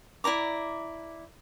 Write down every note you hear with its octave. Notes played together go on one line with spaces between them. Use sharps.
E4 D5 A#5 D6